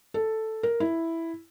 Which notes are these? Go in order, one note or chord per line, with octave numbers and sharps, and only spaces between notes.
A4
A#4
E4